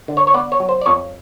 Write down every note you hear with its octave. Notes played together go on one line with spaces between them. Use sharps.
D3
C#5
C#5
B3 D5
C#5
F#3
C5
D5
F2 C#5